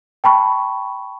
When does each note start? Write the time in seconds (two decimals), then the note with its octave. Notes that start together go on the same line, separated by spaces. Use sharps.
0.24 G5 A5 B5 C#6